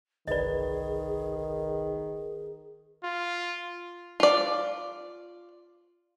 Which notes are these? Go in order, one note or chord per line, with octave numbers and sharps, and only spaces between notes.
G1 C2 D#3 G#4 B4 D5 D#5
F4
F4 D5